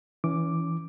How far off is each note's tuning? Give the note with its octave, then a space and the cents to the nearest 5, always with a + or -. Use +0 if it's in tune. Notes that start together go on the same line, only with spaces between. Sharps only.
E3 -5 C#4 +30 D6 +0